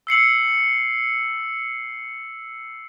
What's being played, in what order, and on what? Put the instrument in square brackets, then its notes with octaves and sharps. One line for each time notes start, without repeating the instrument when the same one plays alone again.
[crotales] E6 C7 C#7 F#7